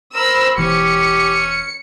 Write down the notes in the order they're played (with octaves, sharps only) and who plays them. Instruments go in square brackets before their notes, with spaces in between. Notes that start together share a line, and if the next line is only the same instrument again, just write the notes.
[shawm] A#4 [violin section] C5 B5 E6
[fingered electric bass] E1 E2 E3 [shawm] C#4 [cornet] G4 [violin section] C#7